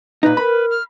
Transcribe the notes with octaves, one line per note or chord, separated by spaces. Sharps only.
A#2 D#4 B4
A#4 B5
F6